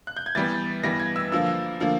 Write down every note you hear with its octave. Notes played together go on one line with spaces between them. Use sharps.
F#6
G6
G#6
E3 G3 B3 A6
E3 G3 B3 A#6
G#6
E6
D3 F3 A#3 E6
D3 F3 A#3